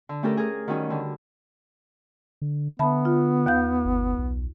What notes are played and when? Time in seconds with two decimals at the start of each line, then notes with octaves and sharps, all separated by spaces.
0.09 D3
0.23 A3 C#4 G4 A4 A#4
0.37 G#4 A#4
0.68 D#3 F#3 G3 C#4
0.90 D3 G3
2.42 D3
2.79 D3 B3 E5 A5 B5
3.05 F4
3.46 D#2 F5 G6
3.85 G1
4.19 B1